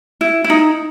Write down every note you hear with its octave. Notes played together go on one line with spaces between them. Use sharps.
E4
E4
D#4